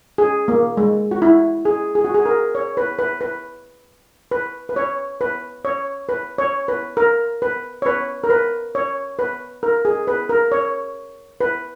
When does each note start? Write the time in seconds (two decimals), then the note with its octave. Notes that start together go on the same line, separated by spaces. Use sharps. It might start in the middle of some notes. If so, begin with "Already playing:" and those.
0.18 G#4
0.48 A#3
0.77 G#3
1.11 F#4
1.22 E4
1.65 G#4
1.95 G#4
2.04 F#4
2.14 G#4
2.26 A#4
2.55 C#5
2.77 B4
2.99 B4
3.21 B4
4.31 B4
4.69 B4
4.76 C#5
5.21 B4
5.65 C#5
6.09 B4
6.38 C#5
6.68 B4
6.97 A#4
7.42 B4
7.82 C#5
7.86 B4
8.24 A#4
8.30 B4
8.75 C#5
9.19 B4
9.63 A#4
9.85 G#4
10.07 B4
10.29 A#4
10.52 C#5
11.41 B4